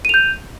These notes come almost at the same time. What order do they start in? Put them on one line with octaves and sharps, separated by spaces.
D#7 F7 G6